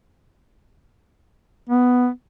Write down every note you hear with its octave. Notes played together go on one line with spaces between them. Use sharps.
B3